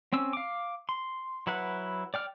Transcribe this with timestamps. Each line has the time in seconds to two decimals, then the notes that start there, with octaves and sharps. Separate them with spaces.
0.13 C4 C#4 E6
0.33 F5 D6
0.89 C6
1.47 F#3 E4 B4 F#5
2.14 D5 G5 F6